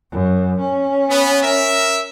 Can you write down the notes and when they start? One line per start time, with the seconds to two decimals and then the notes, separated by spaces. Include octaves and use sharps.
0.12 F#2
0.60 C#4
1.08 B3
1.41 A#4 E5